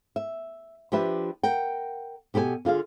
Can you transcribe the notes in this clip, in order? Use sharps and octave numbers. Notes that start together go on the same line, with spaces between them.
E5
F3 D4 G4 B4 E5
A#4 F#5 G5
B2 G4 A4 B4 G#5
D3 F4 G#4 F5